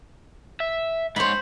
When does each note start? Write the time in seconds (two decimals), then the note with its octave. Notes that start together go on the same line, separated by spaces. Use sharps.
0.60 E5
1.16 G#2 C5 C#5 B5